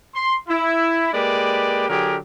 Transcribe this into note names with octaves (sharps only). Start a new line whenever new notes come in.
C6
E4
G#3 A#3 G4 B4 D5
D3 F#3 G4 G#4 A#4